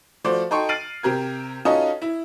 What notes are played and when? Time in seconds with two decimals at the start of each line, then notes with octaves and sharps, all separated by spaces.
0.24 F3 A3 F#4 C5 D5
0.51 D#4 F#4 A4 G5 C6 C#6
0.69 F6 A6 C7 D7 D#7 F#7
1.03 C3 G4 A#4 G#6
1.65 C#4 D#4 F4 F#4 A4 D#5
2.02 E4